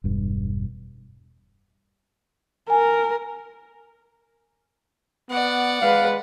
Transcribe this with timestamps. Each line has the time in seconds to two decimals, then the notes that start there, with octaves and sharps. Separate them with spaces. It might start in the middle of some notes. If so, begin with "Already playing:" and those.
0.04 E1 G2
2.70 A#4 G#5
5.30 B3 D5 F#5
5.81 G#3 B4 F5